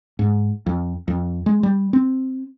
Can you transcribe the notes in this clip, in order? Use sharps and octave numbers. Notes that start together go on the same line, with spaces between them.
G#2
F2
F2
G#3
G3
C4